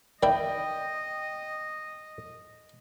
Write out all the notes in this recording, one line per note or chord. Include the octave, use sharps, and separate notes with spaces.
D#3 E4 D5 D#5 G5